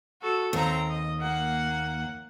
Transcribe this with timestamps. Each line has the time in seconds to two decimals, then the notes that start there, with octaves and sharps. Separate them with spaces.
0.22 F#4 A4
0.53 D#2 C4 A#5
0.90 D#5
1.19 A#3 F#5